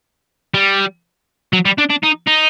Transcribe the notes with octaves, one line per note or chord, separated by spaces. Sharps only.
G3
F#3
G3
D4
D4
D#4
D#4